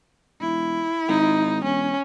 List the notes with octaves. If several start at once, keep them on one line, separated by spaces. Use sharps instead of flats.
E1 E4
G#1 D#4
E1 C#4